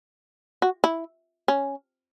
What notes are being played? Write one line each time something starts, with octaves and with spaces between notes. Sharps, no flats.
F#4
E4
C#4